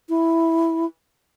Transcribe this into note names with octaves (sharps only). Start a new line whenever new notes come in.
E4